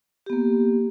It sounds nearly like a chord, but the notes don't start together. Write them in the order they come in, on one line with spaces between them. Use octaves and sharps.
G4 B3 A#3